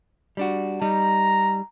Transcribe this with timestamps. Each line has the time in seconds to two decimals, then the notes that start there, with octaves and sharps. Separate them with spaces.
0.37 G3 D4 F#4
0.82 G3 D#4 A#5